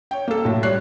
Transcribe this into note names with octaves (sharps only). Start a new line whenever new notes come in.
C#5 G5
A#3 A4
A2 F#3
G3 C#5 F#6 C7